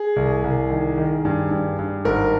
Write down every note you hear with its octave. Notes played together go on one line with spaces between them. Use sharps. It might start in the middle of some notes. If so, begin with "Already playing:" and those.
Already playing: G#4
C2
C2
D#3
D#3
G2
G2
G2
G#1 A#4